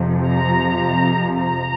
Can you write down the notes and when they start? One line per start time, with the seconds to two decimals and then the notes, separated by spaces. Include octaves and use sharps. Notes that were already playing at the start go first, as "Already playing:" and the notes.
Already playing: F2 C3 F3
0.27 A#5
1.35 A#5